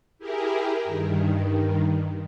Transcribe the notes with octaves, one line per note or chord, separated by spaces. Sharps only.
E4 G4 G#4 A#4
G2 D#3